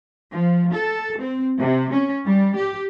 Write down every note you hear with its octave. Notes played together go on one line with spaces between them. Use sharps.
F3
A4
C4
C3
C#4
G3
G4